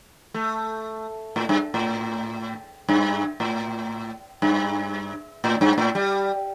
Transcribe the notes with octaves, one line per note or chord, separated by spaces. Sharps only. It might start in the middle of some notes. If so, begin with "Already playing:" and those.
A3
A2
G2
A2
G2
A2
G2
A2
G2
A2
G3